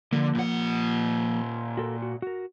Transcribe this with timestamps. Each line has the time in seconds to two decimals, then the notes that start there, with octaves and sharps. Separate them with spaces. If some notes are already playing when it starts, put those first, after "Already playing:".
0.13 D3 F3 A#3
0.35 A#2 F#5
1.77 F#4 A4 A#4
2.02 F#4
2.22 F#4 A#4